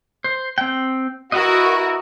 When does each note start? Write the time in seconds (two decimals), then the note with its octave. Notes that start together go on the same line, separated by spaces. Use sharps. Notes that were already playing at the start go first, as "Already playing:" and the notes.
0.24 C5
0.58 C4 G5
1.32 E4 F#4 A#4 B4 D#5